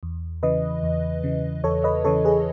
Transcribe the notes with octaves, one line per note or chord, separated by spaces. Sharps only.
E2
C#3 E3 B4 D#5
E2
C#3 E3
E2 A4 C#5
B4 D#5
C#3 E3 A4 C#5
G#4 B4